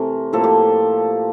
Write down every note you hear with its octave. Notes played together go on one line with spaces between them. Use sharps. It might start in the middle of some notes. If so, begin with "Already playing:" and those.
Already playing: C3 E3 A3 A#4 C5
A2 F3 A#3 A4
G4